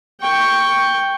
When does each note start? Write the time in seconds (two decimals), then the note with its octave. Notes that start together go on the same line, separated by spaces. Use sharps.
0.21 G5 C#6